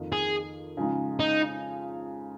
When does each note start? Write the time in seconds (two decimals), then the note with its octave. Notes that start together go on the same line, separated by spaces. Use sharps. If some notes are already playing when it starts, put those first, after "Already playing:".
Already playing: F2 D#3 A#3
0.12 G#4
0.77 C#3 F3 G#3 D#4
1.20 D#4